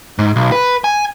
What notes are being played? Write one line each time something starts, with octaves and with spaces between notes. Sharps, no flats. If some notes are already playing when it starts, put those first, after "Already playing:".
G#2
B1
B4
G#5